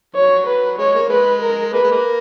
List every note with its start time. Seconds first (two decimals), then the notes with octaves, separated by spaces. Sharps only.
0.15 F#3 C#5
0.47 B4
0.78 G#3 C#5
0.95 A#3
1.10 G#3 B4
1.41 A#4
1.73 A#3 B4
1.83 G#3
1.92 A#3